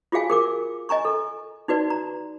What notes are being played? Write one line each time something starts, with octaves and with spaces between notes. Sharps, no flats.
F4 F#4 G#4 F5 G#5
G#4 A#4 D6
D#5 G#5 A#5 C#6
A4
D#4 F#4 B4 D5
A#5